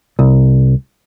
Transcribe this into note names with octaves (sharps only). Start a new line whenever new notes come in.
C2